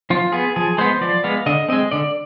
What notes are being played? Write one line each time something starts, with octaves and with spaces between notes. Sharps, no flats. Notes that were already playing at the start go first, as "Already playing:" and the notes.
F3 F4
B3 G#4
F3 G#4
G#3 B3 C5
F3 D5
G#3 B3 F5
D3 D#5
G#3 C4 D#5
D3 D5